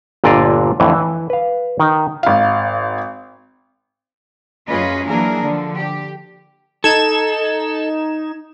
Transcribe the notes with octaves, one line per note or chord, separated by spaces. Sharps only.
G1 A#2 D3 D5 D#5 F5
F2 A2 D3 E3
E3
B4 F5
D#3 D#4
G#1 F5
F#2 C#4 F4 G#4 B4 D#5
E3 F#3 A#3 D4 G#4 A#4
D3 F3
G4
D#4 A4 G#6 E7